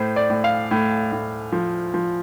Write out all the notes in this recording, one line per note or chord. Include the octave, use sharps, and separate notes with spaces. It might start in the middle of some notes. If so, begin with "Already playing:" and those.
Already playing: A2 C5
D5
A2
F5
A2
A2
F3
F3